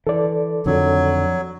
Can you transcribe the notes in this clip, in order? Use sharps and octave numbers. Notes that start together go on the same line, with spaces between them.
E3 A4 D5
F2 D3 D#3 F#3